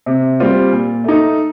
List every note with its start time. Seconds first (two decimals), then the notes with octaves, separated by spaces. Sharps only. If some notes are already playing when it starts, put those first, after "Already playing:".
0.06 C3
0.40 G3 C4 F4
0.72 A#2
1.04 A3 D#4